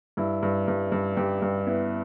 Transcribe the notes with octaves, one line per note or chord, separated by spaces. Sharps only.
G2 E4
G2
G2
G2
G2 G4
G2
B3 E4